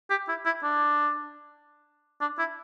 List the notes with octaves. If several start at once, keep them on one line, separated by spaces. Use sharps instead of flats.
G4
E4
E4
D4
D4
E4